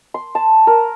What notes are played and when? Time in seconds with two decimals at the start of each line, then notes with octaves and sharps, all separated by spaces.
0.14 C6
0.35 A5
0.67 A#4